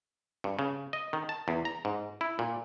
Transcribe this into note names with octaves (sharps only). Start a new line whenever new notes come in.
G2
C#3
D#5
D#3
A5
E2
A#5
G#2
E4
A#2